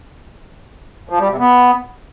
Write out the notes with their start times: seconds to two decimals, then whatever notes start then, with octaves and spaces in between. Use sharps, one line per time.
1.09 F3
1.19 G3
1.29 C3
1.39 B3